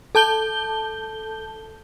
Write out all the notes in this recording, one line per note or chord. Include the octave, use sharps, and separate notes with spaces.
A4 A5 G6 G7